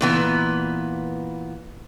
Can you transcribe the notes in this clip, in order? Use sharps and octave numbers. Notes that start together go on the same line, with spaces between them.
A#2 E3 B3